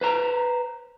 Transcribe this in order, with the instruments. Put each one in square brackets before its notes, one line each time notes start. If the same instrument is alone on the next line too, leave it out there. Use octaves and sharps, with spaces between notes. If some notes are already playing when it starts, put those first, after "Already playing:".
[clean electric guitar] B4 C5 A#5